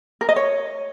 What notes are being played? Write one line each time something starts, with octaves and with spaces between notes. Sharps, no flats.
A#4
D#5
C#5